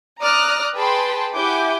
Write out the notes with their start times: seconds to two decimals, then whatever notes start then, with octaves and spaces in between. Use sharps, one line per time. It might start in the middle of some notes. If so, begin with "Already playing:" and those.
0.21 D5 A#5 D#6 F6 F#6
0.75 G#4 B4 G5 A5 B5 C6
1.34 E4 G4 F#5 G#5 D6 G6